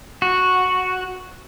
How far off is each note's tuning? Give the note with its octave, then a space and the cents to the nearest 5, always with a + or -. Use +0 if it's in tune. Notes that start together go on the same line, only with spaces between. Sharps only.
F#4 -5